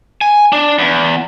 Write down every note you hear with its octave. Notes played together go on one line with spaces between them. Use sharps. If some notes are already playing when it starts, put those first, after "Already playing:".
G#5
D4
E2